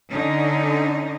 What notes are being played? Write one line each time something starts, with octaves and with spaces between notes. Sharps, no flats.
D3 C#4 D#4